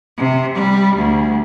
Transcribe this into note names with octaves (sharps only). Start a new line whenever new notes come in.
C3
G3
D2